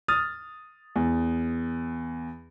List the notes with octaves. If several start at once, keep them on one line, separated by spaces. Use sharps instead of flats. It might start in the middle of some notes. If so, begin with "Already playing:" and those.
D#6 F6 A6
E2